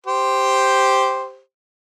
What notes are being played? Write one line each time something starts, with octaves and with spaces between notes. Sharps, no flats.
G4 C5